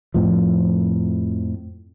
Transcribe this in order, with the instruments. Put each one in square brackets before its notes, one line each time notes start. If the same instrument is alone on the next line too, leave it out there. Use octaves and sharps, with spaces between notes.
[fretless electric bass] F2 A2 F3